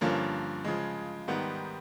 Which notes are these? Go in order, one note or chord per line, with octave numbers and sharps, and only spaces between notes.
G2 D3 F3 A#3 C#4
C#3 F3 G#3
G#2 D#3 G3 B3